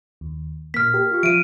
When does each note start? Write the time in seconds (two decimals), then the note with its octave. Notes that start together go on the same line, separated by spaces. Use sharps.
0.21 D#2
0.74 A#2 A#3 F6 B6
0.94 G4 A#4
1.11 F4 G4 C#6
1.23 F3 F4 E5 D7 D#7